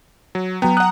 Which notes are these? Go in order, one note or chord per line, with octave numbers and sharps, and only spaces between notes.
F#3
F#3 B3 G5 A#5
F#5 D#6 F#6